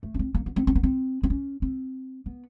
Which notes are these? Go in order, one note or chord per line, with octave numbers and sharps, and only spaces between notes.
A3
C#4
C4
A#3
B3
C4
C4
B3
C4
C4
C#4
C4
B3